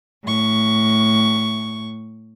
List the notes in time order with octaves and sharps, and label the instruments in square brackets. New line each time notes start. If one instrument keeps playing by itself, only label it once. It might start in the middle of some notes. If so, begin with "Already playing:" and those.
[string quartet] A2 C#6